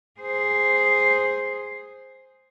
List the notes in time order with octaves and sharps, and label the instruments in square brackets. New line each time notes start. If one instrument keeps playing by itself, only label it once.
[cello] G#4 C5